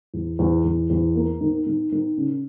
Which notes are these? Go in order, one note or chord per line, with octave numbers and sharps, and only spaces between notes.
E2
E2
E2
E2
A#3
D#3
D#3
D#3
C#3